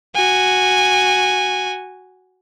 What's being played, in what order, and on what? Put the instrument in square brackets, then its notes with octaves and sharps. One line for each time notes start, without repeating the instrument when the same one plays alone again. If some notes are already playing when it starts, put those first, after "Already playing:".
[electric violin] F#4 G#5